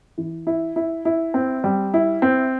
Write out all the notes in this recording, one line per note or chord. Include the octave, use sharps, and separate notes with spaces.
E3
E4
E4
E4
C4
G3
E4
C4